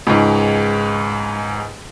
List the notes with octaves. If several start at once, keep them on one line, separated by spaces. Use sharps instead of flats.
C#2 G#2